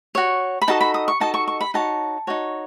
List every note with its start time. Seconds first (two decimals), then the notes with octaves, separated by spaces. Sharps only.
0.15 F#4 C#5
0.62 B5
0.68 D#4 F#4 A4 D#5 A5
0.81 B5
0.94 D#6
1.08 C#6
1.20 D#4 F#4 A4 D#5 A5
1.34 C#6
1.48 C#6
1.61 B5
1.74 D#4 F#4 C#5 A5
2.27 D#4 F#4 C#5